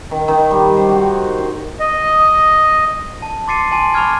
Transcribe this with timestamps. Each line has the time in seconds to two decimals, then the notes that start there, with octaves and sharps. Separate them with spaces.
0.11 D#3
0.28 D#3
0.51 G3
0.77 C5
0.89 F#4
1.38 C5
1.80 D#5
3.22 A5
3.48 C6 D6 A6 C7 C#7 D#7
3.72 G#5 A5 C6 D#7
3.94 B5 C#6 D6 F6 G#6